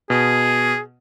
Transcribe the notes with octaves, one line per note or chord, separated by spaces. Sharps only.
B2 G#4